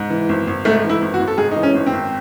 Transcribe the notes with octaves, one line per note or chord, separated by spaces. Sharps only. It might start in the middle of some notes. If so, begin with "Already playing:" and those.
Already playing: G#2
E3
G#1
G#1
G#2 A3
E3
E4
G#1
F#4
G#1
A4
G#2 G#4
E3 D#4
C#4
G#1
C4
G#1